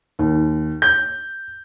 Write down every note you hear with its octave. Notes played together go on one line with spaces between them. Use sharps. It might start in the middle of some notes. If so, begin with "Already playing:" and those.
D#2
G6